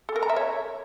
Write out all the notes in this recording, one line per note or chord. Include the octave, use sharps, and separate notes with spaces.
A4
A#4
A#5
E5
C#5